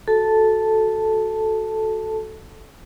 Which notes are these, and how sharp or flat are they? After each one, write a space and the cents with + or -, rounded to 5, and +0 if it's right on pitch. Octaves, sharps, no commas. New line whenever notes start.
F#4 +0 A4 -10 A5 +0